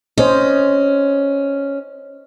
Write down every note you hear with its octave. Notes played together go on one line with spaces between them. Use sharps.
C#4 C5 D#5